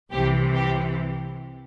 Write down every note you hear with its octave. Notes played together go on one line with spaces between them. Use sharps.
C2 C3 E3 G4
G4